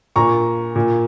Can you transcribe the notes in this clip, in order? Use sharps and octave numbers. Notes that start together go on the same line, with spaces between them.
A#2 A#5 C#6
A#2